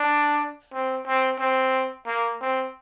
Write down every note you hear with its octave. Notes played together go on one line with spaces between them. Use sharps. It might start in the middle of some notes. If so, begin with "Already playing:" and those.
Already playing: D4
C4
C4
C4
A#3
C4